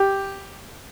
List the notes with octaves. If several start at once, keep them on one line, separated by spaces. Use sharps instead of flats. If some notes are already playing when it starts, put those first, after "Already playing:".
Already playing: G4